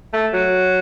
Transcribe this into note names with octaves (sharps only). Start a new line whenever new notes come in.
A3
F#3